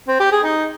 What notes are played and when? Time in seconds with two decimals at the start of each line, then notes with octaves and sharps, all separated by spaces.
0.08 C4
0.20 G4
0.32 G#4
0.43 D#4